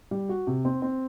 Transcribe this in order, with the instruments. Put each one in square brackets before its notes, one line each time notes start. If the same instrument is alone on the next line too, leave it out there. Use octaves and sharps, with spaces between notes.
[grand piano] G3
F#4
C3
C4
C4